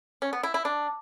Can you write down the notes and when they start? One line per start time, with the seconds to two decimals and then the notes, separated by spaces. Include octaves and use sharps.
0.22 C#4
0.33 B3
0.43 E4
0.54 E4
0.65 D4